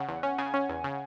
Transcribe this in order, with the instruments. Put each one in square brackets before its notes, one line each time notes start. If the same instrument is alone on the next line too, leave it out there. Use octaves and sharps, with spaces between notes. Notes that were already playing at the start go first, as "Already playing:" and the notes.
Already playing: [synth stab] C#3 [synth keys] F#5
[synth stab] E2
C#4
[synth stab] C#3 [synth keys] G#5
[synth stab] C#4
E2
C#3